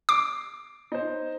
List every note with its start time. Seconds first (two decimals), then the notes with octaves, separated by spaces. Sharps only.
0.09 D6 C7 D7
0.92 D#4 C5